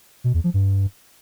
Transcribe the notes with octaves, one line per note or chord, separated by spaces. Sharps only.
B2
E2
F3
G2